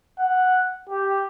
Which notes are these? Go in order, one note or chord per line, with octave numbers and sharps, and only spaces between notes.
F#5
G4